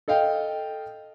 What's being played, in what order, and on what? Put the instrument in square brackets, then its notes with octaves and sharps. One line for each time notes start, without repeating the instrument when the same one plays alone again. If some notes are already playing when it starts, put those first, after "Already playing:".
[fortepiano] A4 D#5 F5 G5